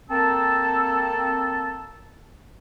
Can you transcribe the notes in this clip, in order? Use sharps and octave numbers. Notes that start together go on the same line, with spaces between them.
A#3 C4 A4 A5